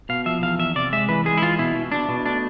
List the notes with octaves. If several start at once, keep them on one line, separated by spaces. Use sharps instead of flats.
B2 F5
F3 E5
E2 F5
E2 E5
C3 D5
G#3 E5
E3 B4
G#3 G#4
E4
E3 F4
B2 E4
B2
B2 D4
B2
A3 D4